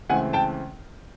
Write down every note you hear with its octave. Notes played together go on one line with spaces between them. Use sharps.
C#2 C#3 E3 A3 C4 F#5 G#5
G5 A5